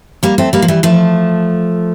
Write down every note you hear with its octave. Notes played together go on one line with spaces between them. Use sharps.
G3 A#3
A3 C4
G3 A#3
F3
E3 G3
F3 A3